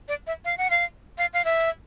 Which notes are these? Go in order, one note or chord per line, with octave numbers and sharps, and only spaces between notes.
D5
E5
F5
F#5
F5
F5
F5
E5